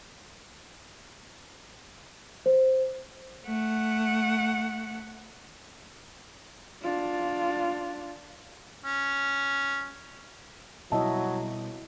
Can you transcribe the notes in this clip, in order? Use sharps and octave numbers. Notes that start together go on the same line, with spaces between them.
C5
A3 F#5
D4 F4
C#4
B2 F#3 G3 C4 E4 D#5 E5 A5